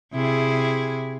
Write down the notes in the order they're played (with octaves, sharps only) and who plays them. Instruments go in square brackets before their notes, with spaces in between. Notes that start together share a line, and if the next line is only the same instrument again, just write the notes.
[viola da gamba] C3 E4 G#4